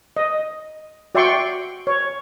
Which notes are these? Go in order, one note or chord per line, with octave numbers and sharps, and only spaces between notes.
D#5
F#4 D5 E5 G5 C6 C#6
C#5